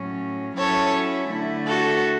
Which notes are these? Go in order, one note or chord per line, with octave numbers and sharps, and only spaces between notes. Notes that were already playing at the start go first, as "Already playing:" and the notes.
Already playing: A2 F#3 C#4
F#3 C#4 E4 A4 C#5
D3 A3 E4
F#4 A4